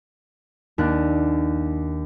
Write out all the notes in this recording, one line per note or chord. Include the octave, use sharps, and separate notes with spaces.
D#2 D4 F#6